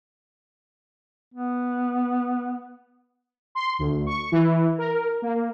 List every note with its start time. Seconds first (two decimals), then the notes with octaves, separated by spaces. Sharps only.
1.34 B3
3.55 C6
3.79 D2
4.06 C#6
4.32 E3
4.78 A#4
5.22 A#3